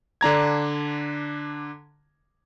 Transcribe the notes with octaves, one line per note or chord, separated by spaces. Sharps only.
D3 D4 A#5 G#6